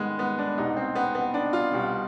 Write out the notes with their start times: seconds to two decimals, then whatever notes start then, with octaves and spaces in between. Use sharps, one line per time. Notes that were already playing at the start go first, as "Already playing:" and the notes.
Already playing: G#2 D#3 G3 G#3 B3
0.19 B3
0.38 D4
0.57 C2 B2 G3 D#4
0.76 C4
0.95 B3
1.15 B3
1.34 D4
1.53 F4
1.72 C2 B2 G3